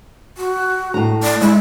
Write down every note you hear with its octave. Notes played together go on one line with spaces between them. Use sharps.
F#4
A2 A#5
D5
G#3 E4